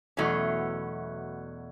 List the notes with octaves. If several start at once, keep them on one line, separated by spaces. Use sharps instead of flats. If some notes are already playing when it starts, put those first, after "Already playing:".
E2 B2 F#3 A3 C#4